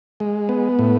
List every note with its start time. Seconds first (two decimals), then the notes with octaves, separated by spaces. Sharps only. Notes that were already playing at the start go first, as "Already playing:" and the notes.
0.20 G#3
0.49 B3
0.79 A2